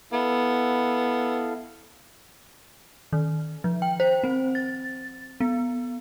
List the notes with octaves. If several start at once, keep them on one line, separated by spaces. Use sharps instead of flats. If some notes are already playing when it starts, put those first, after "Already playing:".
B3 E4 A4 F5
D#3
F3
G5
C5
C4
A6
B3